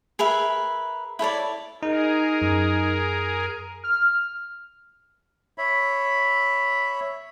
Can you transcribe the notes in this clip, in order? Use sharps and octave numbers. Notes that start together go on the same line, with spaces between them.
G#4 A#4 B4 E5
E4 A4 C#5 D5
D#4 G#4 A#4
F#2
F6
C#5 E5 B5